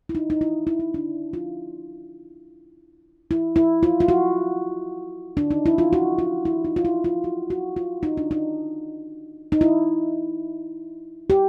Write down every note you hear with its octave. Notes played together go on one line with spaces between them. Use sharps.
E4
D#4
D#4
E4
E4
D#4
D4
F4
E4
E4
F4
F4
F#4
D4
D#4
E4
F4
F#4
F4
E4
D#4
F4
E4
F4
F#4
F#4
F4
D#4
D4
D#4
D#4
E4
G4